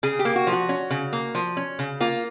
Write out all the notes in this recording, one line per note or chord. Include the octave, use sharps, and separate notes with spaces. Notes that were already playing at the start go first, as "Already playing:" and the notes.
C#3 G#4
G4
A#3
F#4
F3
F#4
C#4
C#3
A#3
F3
C#4
C#3
A#3 F4